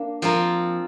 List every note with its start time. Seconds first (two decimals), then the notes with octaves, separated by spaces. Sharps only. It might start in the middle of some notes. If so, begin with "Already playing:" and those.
Already playing: A#3 D4
0.22 F3 C4 F4 A#4